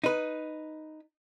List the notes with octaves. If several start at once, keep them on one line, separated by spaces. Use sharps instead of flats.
D#4 B4